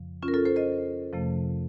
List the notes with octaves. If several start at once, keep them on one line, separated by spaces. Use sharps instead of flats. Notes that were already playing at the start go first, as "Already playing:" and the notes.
Already playing: F2 C#3 F3
C#4 F4
A#4
F4 A4
A4 C5
C5 D#5
F2 C3 F3 A3